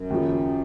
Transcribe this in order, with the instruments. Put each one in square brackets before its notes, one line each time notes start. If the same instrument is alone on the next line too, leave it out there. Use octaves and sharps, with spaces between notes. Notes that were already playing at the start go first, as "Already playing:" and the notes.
Already playing: [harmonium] F#2
[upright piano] D#2 C#3 F3